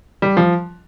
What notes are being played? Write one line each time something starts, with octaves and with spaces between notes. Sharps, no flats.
G3
F3